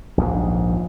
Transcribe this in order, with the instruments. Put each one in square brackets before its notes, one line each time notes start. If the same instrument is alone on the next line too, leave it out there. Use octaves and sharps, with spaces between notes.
[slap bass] A#1 D#2 G#2